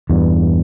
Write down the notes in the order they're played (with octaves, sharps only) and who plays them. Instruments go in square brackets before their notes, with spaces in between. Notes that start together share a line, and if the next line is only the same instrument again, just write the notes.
[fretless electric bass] E2 G2